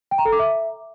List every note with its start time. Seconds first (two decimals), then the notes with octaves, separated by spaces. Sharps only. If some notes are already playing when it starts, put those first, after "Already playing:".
0.11 G5
0.18 A#5
0.25 A4
0.32 D6
0.39 E5